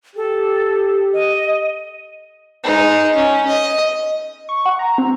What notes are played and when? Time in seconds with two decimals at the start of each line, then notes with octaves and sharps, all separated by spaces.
0.16 G4 A4
1.13 D#5
2.63 G#3 D#4
3.15 C#4
3.48 D#5
4.49 C#6
4.66 F#5
4.79 A#5
4.98 C4